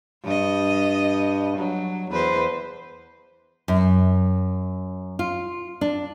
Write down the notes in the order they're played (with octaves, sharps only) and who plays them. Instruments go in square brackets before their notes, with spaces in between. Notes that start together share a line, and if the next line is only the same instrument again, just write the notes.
[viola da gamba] G2 D#5
F#3
E2 B4 C5
[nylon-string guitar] F#2
F4
D4